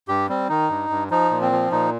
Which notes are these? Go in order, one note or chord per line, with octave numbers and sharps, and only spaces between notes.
G2 G4
G3 C4
D#3 D#4
G2
G2
F3 D#4
A#2
C4
F3
A#2 D#4